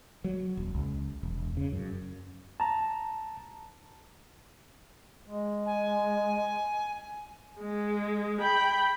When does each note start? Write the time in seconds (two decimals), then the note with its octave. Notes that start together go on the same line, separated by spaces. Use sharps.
0.24 F#3
0.57 D#1
0.74 C#2
1.23 E1
1.57 C#3
1.73 F#2
2.60 A5 A#5
5.28 G#3
5.66 G#5
7.60 G#3
8.41 G5 B5